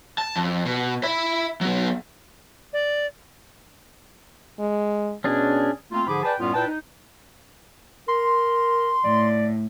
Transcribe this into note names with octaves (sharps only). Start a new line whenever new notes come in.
A5
F2
B2
E5 B5
F#3 B3
D5
G#3
B2 C#4 D4 G#4
A3 A#3 C4 F4
G#2 D3 F3 G#4 B5 D6
G#4 B4 D5 G5 A5
F#2 A2 G3 B3 F4
A#2 E4 B4 G5 A5
D#4
A#4 C6
A2 D5